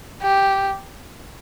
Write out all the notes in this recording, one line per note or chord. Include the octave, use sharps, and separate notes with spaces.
G4